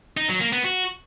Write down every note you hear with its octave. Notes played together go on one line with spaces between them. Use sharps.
D#4
F#3
A#3
B3
F#4